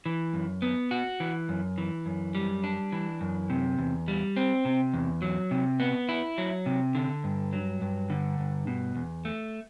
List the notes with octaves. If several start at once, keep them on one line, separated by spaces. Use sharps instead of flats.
E3
F#2
B3
F#4
E3
F#2
E3
F#2
G3
D4
E3
F#2
C3
E2
G3
C4
C3
E2
F#3
C3
B3
E4
F#3
C3
D3
G2
F#3
G2
D3
G2
B2
E2
A3